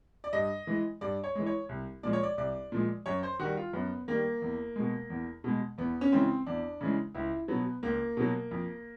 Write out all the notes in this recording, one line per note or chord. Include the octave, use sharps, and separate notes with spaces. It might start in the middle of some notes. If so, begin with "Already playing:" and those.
D5
G2 D#5
E3 G#3
G2 D5
C#5
E3 G#3
C#5
C2
A#2 F3 G#3 D5
C#5
D5
C2 D5
A#2 F3 G#3
F#2 C#5
C5
D#3 G3 F#4
F4
F#2 B3
D#3 G3 A#3
E2
B2 G#3
E2
B2 G#3
E2 B3
C#4
C#3 E3 G#3 C4
E2 D4
C#3 E3 G#3
C#2 E4
B2 F#3 B3
C#2 A#3
B2 F#3
F2